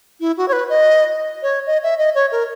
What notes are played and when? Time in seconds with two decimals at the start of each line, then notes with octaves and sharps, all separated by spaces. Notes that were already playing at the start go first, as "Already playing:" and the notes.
0.20 E4
0.37 F#4
0.48 C#5
0.53 B4
0.69 D#5
1.42 C#5
1.66 D#5
1.83 E5
1.98 D#5
2.15 C#5
2.32 A#4